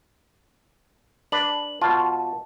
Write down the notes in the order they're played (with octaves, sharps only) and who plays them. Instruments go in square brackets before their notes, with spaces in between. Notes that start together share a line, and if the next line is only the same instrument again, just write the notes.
[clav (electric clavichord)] D4 B4 [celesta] F#7
[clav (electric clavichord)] B2 F4 [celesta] A5